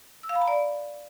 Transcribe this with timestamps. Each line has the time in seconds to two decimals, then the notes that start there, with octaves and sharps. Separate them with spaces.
0.23 E6
0.29 F5
0.35 B5
0.41 A#5
0.48 D5